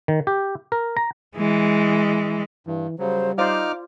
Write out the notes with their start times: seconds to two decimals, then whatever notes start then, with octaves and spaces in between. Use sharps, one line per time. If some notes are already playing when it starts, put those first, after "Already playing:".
0.08 D#3
0.27 G4
0.72 A#4
0.97 A#5
1.36 E3 G#3
2.67 G2 E3
2.99 C#3 F#3 G3 C5
3.38 D#4 F4 C5 D5 F5 D6 F6